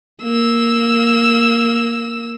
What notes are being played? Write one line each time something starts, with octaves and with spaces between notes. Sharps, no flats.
A#3 E6